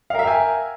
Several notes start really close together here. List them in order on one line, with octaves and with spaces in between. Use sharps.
F5 A#4 E5 G5 G#5